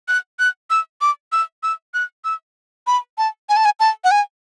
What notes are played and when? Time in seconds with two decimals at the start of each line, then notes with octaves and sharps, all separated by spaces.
0.08 F#6
0.39 F#6
0.70 E6
1.01 D6
1.32 E6
1.63 E6
1.94 F#6
2.24 E6
2.87 B5
3.18 A5
3.49 G#5
3.57 A5
3.65 G#5
3.80 A5
4.04 F#5
4.11 G#5